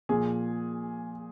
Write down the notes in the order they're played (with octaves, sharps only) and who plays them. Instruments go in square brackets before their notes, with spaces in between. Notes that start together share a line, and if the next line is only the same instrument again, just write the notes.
[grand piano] A#2 F3 G#4